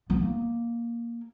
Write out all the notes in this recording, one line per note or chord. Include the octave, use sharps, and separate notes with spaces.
B3
A#3